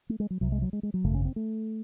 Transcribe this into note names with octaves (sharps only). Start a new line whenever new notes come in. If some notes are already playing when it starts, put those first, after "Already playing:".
A3
G#3
F#3
C2 C3 F#3
G#3
F#3
G#3
G#3
F#3
G#1 F#2 C#3 A3
C#4
C4
A3